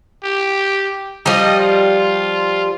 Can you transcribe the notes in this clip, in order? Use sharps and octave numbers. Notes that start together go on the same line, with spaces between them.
G4
F3 G3 D#5
F4